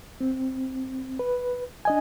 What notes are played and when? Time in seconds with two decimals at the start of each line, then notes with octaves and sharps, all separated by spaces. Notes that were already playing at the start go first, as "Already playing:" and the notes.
0.21 C4
1.19 B4
1.85 D4 D#5 G#5